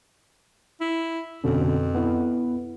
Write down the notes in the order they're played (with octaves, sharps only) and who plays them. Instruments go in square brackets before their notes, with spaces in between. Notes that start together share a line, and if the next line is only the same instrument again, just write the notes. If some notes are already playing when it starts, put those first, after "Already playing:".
[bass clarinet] E4
[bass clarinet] F2 [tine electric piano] B2 D3 C#4
[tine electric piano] B3 E4